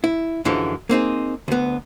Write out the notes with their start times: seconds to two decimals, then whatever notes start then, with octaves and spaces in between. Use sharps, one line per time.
0.04 E4
0.45 F#2 D3 E3 F3 G#3
0.89 A#3 C4 D#4 G#4
1.48 D2 B3